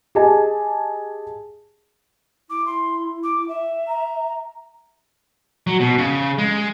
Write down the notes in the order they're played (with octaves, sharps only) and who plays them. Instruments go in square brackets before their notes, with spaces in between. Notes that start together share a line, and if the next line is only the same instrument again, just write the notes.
[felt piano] G4 G#4 D#5 G#5 A5
[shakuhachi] E4 [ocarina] D6
[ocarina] C6
D6
E5
[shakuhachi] A#5
[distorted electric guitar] F#3
B2
C#3
G#3